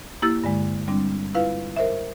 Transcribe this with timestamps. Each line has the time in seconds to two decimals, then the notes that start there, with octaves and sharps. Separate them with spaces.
0.22 A#3 E4 G4 E6 A6
0.44 G2 D3 G#3
0.88 G3 C4 D4
1.35 E4 F4 B4 F5
1.76 A#4 C5 D#5 E5